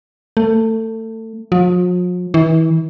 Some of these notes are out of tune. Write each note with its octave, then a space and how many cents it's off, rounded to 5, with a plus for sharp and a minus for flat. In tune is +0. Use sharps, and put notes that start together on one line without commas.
A3 +25
F3 +45
E3 -30